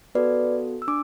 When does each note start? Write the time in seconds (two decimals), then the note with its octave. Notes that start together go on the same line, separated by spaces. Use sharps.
0.15 B3 F#4 A4 B4 D5
0.82 E6
0.88 D4 D6